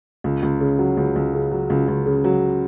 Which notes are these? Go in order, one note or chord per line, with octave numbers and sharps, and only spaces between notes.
C#2
C#2
C#3
F#3
C#2
C#2
C#3
F#3
C#2
C#2
C#3
F#3